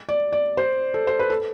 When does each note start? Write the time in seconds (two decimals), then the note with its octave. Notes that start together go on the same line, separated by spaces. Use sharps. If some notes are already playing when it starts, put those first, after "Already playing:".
0.09 D5
0.32 D5
0.57 C5
0.94 A4
1.07 C5
1.19 B4
1.30 A4